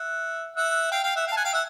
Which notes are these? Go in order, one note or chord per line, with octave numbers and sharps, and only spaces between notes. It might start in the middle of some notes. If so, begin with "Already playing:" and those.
Already playing: E5 F#5
E5 F#5
F5 G5
F5 G5
E5 F#5
F5 G5
A5
F#5 G#5
F5 G5
E5 F#5